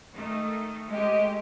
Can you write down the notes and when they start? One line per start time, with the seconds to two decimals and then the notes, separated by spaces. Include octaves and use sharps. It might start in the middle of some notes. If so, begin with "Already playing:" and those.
0.14 D#3 A3 D#4
0.91 G#3 A3 G4 D#5